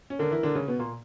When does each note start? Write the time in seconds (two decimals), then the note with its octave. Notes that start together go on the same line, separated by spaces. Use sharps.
0.10 C#4
0.19 D3 D4 A#4
0.31 E3 E4
0.43 D3 D4
0.55 C#3 C#4
0.68 B2 B3
0.79 A#2 A#3